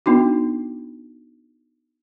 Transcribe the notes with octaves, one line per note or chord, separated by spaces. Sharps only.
B3 D4 D#4 F#4